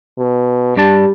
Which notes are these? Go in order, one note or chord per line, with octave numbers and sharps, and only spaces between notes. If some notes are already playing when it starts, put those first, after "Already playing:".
B2
G2 G3 D4 A5